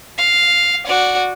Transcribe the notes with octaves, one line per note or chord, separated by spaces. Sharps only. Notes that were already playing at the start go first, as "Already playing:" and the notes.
F5
F#4 D5